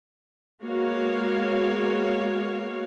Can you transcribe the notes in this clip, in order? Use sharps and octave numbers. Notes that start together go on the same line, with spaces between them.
G#3 A#3 B3 F#4 C#5 F5